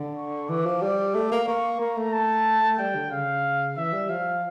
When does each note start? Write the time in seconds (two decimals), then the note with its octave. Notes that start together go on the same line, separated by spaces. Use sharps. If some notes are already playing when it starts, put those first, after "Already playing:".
Already playing: D3
0.17 C#6
0.49 E3 D6
0.66 F3
0.82 G3 D6
1.15 A3
1.32 A#3
1.47 A#3 C#6
1.80 A#3 A#5
1.97 A3
2.13 A5
2.78 G3 G5
2.95 D3
3.11 C#3 F5
3.77 E3 E5
3.93 G3
4.10 F3 F5